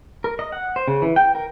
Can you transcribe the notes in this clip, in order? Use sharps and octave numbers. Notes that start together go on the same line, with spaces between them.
A#4
D#5
F#5
C5
C#3
E3
G5
A#4